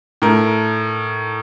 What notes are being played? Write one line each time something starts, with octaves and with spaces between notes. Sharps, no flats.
A2 A3 A#4